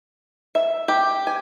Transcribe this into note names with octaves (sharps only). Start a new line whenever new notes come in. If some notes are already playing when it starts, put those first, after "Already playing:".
E5
G4
G#5